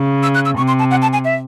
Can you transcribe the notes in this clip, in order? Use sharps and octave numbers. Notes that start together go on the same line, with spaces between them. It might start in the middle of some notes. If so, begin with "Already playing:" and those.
Already playing: C#3
E6
F#6
E6
C3 C#6
C6
A5
F#5
A5
G#5
E5